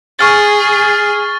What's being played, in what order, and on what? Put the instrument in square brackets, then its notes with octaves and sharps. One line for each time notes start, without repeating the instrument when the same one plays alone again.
[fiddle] G#4 [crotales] C#6 F6 A6